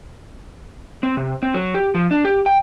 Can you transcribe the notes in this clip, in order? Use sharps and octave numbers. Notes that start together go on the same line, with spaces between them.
C4
C3
C4
F#3
G4
F3
D4
G4
G5